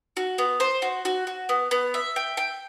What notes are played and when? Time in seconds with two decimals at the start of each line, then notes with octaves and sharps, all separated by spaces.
0.17 F#4
0.38 B3
0.60 C5
0.82 F#4
1.05 F#4
1.27 F#4
1.49 B3
1.71 B3
1.94 E5
2.16 G5
2.37 G5